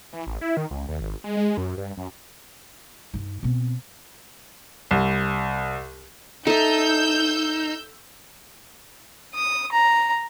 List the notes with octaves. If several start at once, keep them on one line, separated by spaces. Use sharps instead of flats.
E3
A1
E4
D#3
C#2
D#2
G#1
G#3
G#3
F#2
G2
F#2
G2 D#4
B2 C4
C2
D#4 A4 E5 E6 G6
D#6
A#5